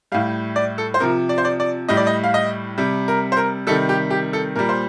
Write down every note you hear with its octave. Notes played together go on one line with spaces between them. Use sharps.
A2 G3 F5
D5
A4
C5
C3 F3 A#4
D5
C5
D5
D5
A2 G3 D#5
D5
D#5
F5
D#5
C3 G3
A#4
C5
A#4
C3 D#3 G3 A4
G4
G4
A4
A#2 G3 A#4
C5